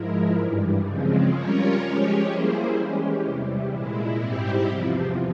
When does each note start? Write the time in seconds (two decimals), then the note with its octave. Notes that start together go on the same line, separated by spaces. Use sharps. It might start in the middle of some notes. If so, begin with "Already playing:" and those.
Already playing: G#2 F3 G#3 E4 A#4
0.37 G2 E3 G3
0.86 C#3 F3 G#3 C4
1.33 G3 C#4 F4 A#4 C#5
1.81 F3 G#3 C#4 G4 C#5
2.29 G3 A#3 E4 G#4 C5
2.76 E3 G#3 C#4 G4
3.25 E2 C3 E3 G3
3.73 A#2 G#3 E4
4.20 G#2 G3 C4 E4 G4
4.68 E2 C3 F3